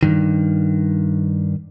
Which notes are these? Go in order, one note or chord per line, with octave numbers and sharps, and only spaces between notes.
G2 D#3